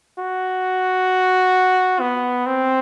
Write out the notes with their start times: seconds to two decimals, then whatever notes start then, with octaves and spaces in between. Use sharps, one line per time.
0.19 F#4
2.00 B3
2.46 C4